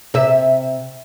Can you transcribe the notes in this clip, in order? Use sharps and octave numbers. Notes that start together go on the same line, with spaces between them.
C3 E5